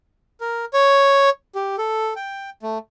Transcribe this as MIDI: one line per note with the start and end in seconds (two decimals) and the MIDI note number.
0.41 0.65 70
0.73 1.30 73
1.55 1.76 67
1.78 2.13 69
2.16 2.50 79
2.63 2.78 57